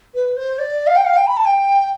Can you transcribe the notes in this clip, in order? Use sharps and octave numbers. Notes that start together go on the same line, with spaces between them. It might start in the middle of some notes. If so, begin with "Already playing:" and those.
B4
C5
D5
F5
G5
F5
G5
B5
A5
G5